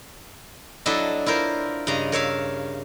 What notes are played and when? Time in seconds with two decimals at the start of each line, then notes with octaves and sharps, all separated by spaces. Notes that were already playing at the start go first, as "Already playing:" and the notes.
0.86 F#3 D4 E4 A4 D#5 E5
1.26 E4 F4 A#4 C5
1.87 G2 C#3 D#5 A#5
2.12 A#4 C#5 E5 F5